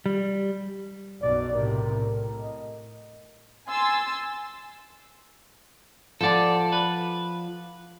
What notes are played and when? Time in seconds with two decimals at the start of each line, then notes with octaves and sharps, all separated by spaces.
0.06 G3
1.22 B1 F#2 B2 D5
1.54 A2 C3 A#4
1.94 A2
2.39 D#5
3.69 G#5 C6 E6 A6
6.21 F3 A4 D5 F#5 A5
6.72 B4